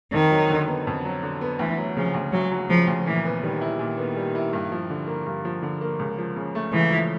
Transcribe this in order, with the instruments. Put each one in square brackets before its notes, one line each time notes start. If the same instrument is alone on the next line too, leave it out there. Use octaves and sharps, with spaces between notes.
[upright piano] F2 [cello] D#3
[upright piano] F#3
D3
B3
F2
F#3
D3
B3
[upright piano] D2 [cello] E3
[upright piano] F#3
[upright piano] C#3 [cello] F3
[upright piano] D2
[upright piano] D2 [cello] F#3
[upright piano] F#3
[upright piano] C#3 [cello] F3
[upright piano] D2
[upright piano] A#2 [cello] E3
[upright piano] B3
[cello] D#3 [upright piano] G3
[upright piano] E4
[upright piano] A#2 [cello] D#3
[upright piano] B3
G3
E4
G2
F3
D3
A#3
G2
F3
D3
A#3
C#2
F3
C#3
A3
[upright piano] C#2 [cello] E3
[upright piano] F3